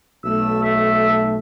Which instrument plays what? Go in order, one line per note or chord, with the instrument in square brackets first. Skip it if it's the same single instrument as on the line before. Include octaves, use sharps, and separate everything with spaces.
[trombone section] B1 A3 [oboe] E6
[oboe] E5